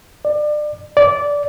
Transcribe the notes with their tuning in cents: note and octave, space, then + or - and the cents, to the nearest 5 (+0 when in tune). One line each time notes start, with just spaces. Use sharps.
D5 +30
D5 -15